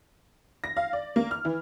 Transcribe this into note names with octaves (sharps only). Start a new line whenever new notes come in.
A#6
F5
D5
A#3
F6
E3